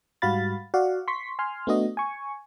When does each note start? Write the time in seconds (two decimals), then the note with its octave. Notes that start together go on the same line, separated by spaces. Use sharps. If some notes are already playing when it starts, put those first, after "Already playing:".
0.22 G#2 G3 F#4 F5 B5 A6
0.74 F#4 D5 F5 F#5
1.08 C6 C#6 B6
1.39 G#5 C6 F6
1.67 A3 B3 D4 F#4 D#5
1.97 G#5 C#6